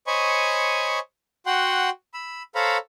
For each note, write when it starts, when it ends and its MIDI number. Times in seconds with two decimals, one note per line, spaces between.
0.07 0.99 72
0.07 0.99 73
0.07 0.99 75
0.07 0.99 80
0.07 0.99 83
0.07 0.99 85
1.46 1.90 66
1.46 1.90 78
1.46 1.90 79
1.46 1.90 84
2.14 2.43 83
2.14 2.43 88
2.55 2.77 69
2.55 2.77 72
2.55 2.77 73
2.55 2.77 77
2.55 2.77 82
2.55 2.77 83